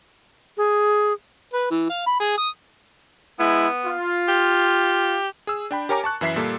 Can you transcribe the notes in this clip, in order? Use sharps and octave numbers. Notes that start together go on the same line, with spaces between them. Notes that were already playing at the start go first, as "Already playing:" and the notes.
G#4
B4
E3
F5
B5
G#4
D#6
G#3 B3 E4
F4
G4
G#4 E6
D4 G5 B5
G4 A#4 C#5 G#5 A#5 D6
A5 C#6 F#6
F#2 E3 E5 B6 C7
A#2 G3 A#3 A4